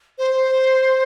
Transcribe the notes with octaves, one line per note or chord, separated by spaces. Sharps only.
C5